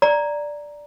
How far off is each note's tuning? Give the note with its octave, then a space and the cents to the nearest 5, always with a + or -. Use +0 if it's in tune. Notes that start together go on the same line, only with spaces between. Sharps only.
D5 +0 A#5 +0